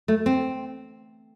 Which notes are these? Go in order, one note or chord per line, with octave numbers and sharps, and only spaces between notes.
A3
C4